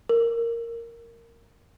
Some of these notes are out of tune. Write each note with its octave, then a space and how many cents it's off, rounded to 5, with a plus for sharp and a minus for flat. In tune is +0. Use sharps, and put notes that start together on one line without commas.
A#4 -10